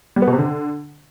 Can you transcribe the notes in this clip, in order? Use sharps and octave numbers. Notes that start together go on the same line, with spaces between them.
G3
B3
B2
C3
D3